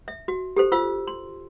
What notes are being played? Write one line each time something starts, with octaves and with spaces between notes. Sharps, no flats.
E5
F#4
G4 A4 C5
F4 C5 F5 E6
C6